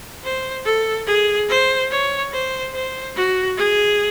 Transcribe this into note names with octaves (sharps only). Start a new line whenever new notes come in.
C5
A4
G#4
C5
C#5
C5
C5
F#4
G#4